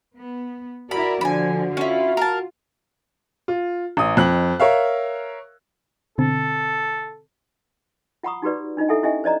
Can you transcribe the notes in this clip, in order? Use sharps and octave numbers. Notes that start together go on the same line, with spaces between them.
B3
E4 F#4 A#4 D5 B5
D3 F3 G#5 B5
C#4 E4 F4
A#4 A5
F4
A1 D#6
F2 F#6 F#7
A#4 C#5 E5 F5
B2 D3 C4 A4
F4 F#5 A#5 B5 C#6 D#6
D#4 F#4 G4 B4 D5
D4 D#4 F4 D#5
E4 A4 E5 F#5 G#5
C#4 E4 G4 D#5 E5 G#5
C5 D5 D#5 A#5